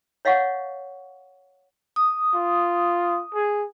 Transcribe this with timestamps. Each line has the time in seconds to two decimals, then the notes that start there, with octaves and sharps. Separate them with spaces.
0.25 C#5 D#5 F5 F#5 C#6
1.96 D#6
2.34 F4
3.34 G#4